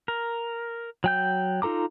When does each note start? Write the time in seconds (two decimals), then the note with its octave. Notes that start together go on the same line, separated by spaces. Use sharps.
0.08 A#4
1.04 F#3 G5 G6
1.62 D#4 F4 A4 A#5 D6